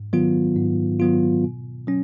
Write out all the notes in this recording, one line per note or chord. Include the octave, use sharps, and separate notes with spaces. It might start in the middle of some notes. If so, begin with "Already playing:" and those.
Already playing: G#2
D#3 F#3 B3 F4
G#2
D#3 F#3 B3 F4
B2
F#3 C#4